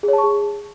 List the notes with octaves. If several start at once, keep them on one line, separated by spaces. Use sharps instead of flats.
G#4
C#5
A5
C#6
G#4